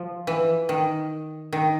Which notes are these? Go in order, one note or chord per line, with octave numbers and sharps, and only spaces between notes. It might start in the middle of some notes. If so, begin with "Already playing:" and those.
Already playing: F3
E3
D#3
D#3